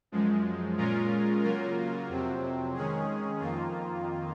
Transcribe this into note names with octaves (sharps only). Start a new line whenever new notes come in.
F#2 F3 G#3
A#2 G#3 C#4 F4 A#4
C#3 F#3 A#3 F4 A#4
F2 C3 F#3 C4
D#3 G#3 C#4 G#4
F2 D#3 A#3 F4